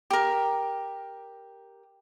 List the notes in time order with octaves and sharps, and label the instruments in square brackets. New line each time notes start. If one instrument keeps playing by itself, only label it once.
[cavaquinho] G4 A#4